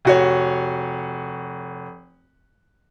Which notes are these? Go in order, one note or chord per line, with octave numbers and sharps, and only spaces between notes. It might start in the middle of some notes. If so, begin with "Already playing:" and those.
F1 F#4 C#5